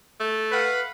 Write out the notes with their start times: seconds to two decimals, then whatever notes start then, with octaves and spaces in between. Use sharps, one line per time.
0.20 A3
0.52 B4 F5 F#5